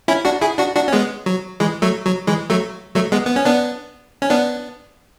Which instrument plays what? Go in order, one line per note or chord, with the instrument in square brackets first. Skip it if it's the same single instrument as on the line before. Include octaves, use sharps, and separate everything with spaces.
[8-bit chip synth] C#4 E4
D4 F#4
E4 G#4
D4 F#4
D4 F#4
C#4
G#3 B3
F#3
E3 G#3
F#3 A3
F#3
E3 G#3
F#3 A3
F#3 A3
G#3 B3
B3
C#4
B3 D4
C#4
B3 D4